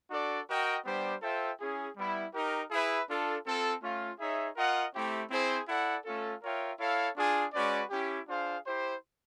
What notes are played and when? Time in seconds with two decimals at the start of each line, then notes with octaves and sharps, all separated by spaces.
0.11 D4 F#4 A4 D5
0.48 F#4 A#4 D#5 G5
0.85 G3 B3 D4 G4 C5
1.22 F4 A4 C5 E5 G5
1.59 C#4 E4 G#4
1.97 G3 B3 E4
2.34 D#4 G4 A#4
2.70 E4 G#4 B4 E5
3.08 D4 F4 A4
3.46 C4 F4 A4
3.82 A3 C#4 F4
4.20 D#4 G#4 C#5 E5
4.57 F4 A#4 D#5 F#5
4.94 A3 C4 E4 G4
5.30 C4 E4 G#4 C5
5.68 E4 A4 D5 F#5
6.05 A3 C#4 F4 A4
6.42 F4 A#4 C#5 E5 G5
6.79 E4 A4 C#5 F5
7.17 D4 F4 G#4
7.53 G#3 C#4 F#4 B4 D5
7.90 C#4 E4 G4
8.28 D4 F4 G#4 C5 F5
8.65 E4 G4 C5